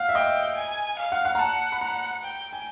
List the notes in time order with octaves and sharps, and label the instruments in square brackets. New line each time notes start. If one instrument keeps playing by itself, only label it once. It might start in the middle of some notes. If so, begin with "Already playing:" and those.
Already playing: [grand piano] F5 F#5
E5
[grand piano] D#5 [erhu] G5
[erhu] G#5
F5
[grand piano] F#5
F#5
A#5
[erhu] F#5 [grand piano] A5
[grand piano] B5
A#5
[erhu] G5
[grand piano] G#5